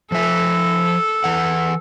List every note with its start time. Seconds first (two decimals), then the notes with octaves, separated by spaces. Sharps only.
0.12 F3 A4 E5
1.24 E3 F#5